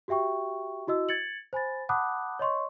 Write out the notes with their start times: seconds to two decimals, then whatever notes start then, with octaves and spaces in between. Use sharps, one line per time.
0.08 F#4 G4 E5 G5 C#6
0.87 E4 F#4 D#5 E6
1.09 G#6 A6 C#7 F#7
1.53 C5 G#5 B5 A6
1.89 F#5 A5 B5 D6 D#6 F#6
2.39 C#5 D#5 C6 C#6